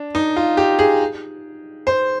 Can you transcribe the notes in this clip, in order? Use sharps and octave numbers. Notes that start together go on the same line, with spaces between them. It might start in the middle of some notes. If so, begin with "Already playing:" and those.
Already playing: D4
D#4
F4
G4
G#4
C5